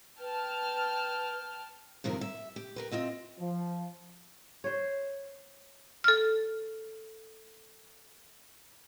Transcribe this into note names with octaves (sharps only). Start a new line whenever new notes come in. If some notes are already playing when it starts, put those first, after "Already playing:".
B4 G5 A5 F6
G2 C3 D#3 F3 A#4
E5
G4
G4 A#4 B4
C4 F4 D#5 E5
F3
C5 C#5
A4 F6